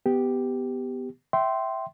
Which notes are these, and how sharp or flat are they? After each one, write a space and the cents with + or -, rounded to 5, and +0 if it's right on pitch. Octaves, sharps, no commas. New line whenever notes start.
B3 +10 G4 +0
E5 +0 G5 -25 C6 +0